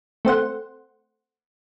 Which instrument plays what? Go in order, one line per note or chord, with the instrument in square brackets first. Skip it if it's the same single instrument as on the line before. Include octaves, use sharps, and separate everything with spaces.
[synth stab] A3 C4 C5 F#5